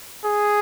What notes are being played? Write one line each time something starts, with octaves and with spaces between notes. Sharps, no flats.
G#4